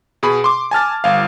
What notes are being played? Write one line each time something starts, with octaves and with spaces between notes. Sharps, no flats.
B2 G#4 B5
C6 D6
G#5 A5 F6 A6
G1 F5